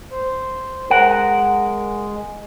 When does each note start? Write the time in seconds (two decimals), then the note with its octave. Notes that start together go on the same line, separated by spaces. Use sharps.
0.11 C5
0.90 G#3 A#4 F#5